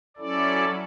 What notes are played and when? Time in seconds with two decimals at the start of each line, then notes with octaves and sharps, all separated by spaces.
0.17 F#3 C#4 E4 A4 D5